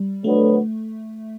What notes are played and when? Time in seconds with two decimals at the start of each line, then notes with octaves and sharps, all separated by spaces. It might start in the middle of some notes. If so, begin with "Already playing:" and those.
Already playing: G3
0.24 D2 D3 F#3 A3 B3